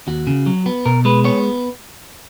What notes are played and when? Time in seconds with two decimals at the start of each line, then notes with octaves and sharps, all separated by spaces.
0.07 D#2 F#4
0.27 C#3
0.46 F#3
0.66 B3
0.86 B2 A#4
1.05 G#3 B4
1.24 B3 C#5